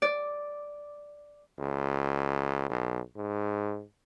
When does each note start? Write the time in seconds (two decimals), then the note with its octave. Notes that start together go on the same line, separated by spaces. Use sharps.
0.02 D5
1.59 C#2
2.70 B1
3.16 G#2